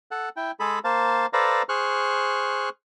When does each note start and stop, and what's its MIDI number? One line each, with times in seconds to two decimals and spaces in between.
0.11 0.29 69
0.11 0.29 78
0.37 0.51 64
0.37 0.51 79
0.60 0.79 56
0.60 0.79 68
0.60 0.79 69
0.60 0.79 83
0.84 1.26 58
0.84 1.26 72
0.84 1.26 77
0.84 1.26 81
1.33 1.62 69
1.33 1.62 71
1.33 1.62 72
1.33 1.62 74
1.33 1.62 77
1.33 1.62 82
1.69 2.69 68
1.69 2.69 72
1.69 2.69 85
1.69 2.69 89
1.69 2.69 90